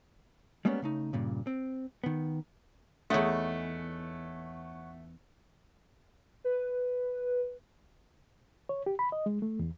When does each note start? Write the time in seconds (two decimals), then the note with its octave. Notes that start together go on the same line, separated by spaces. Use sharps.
0.65 G3 G#3 A#3 B3 C#4
0.82 C#3 A3 D#4
1.13 G2 A#2 C#3
1.47 C4
2.04 D#3 B3
3.10 E2 A3 D#4 C#5 F#5
6.44 B4
8.69 C#5
8.86 G4
8.99 B5
9.12 D#5
9.26 G#3
9.42 A3
9.59 E2